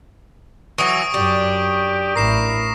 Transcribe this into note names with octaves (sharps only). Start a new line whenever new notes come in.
E3 F#3 C#6 D#6 D7
F#2 D4 G4
A1 E4 A#4 A#6 C7 E7